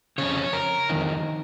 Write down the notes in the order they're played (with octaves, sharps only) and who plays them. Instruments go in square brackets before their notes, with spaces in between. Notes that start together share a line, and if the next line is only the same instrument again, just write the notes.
[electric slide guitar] F2 C#3 C#5
A#4
F2 D#3